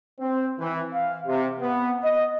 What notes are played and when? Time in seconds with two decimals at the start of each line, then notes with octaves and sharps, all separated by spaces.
0.19 C4
0.60 E3
0.93 F5
1.27 C3
1.61 B3
2.02 D#5